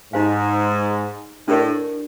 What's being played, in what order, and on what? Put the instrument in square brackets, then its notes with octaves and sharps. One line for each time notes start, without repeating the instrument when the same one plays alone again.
[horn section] G#2 [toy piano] D#4 G4 C5 F5 G#5
[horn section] A2 [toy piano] D4 G4 A#4 D5